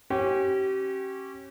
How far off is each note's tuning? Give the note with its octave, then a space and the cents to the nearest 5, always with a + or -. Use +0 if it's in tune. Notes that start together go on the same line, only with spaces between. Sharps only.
C#4 -30 G4 -30